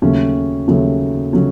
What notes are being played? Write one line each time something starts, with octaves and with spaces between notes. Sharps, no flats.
D#2 C#3 F#3 A3 C#4
D#2 C#3 F#3 A3 C#4
C#3 F#3 A3 C#4